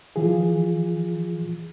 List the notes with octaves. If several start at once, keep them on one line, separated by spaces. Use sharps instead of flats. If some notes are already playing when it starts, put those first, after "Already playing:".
E3 F3 F4 G#4